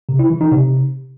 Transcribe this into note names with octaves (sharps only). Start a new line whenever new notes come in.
C3
E4
E3
D#4
C3